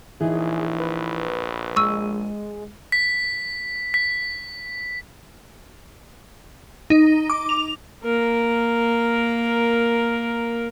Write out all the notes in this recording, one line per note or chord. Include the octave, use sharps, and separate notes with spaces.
A#1 E3 D#4 G#4
B4
G#3 C#6 E6 D#7
B6
B6
D#4
D6
F7
A#3 A#4